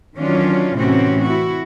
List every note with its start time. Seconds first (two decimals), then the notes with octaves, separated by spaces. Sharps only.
0.17 D#3 E3 F#3 C#4 D4 F4
0.74 A2 C3 E3 C4 C#4 F#4
1.23 E4 F#4